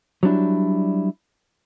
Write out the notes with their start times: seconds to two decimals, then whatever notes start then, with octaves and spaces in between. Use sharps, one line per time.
0.23 F#3 G3 D4 E4